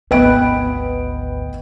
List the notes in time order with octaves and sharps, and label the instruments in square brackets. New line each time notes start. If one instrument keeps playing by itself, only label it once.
[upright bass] G#1 D2 [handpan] B3 B4 [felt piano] D#5 G5 D7